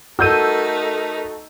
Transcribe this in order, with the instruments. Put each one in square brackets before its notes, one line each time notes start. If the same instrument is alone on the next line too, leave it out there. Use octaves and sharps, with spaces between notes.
[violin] A3 D#4 [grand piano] F#4 A4 [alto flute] A#4 [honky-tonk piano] E6 G6 D#7